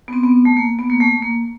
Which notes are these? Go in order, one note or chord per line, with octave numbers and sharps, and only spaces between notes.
B3
C4
B3
A3
A#3
B3
A#3
A3
A#3